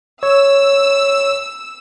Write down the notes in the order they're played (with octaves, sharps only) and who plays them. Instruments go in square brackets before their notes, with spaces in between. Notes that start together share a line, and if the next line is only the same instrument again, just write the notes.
[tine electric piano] C#5 [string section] E6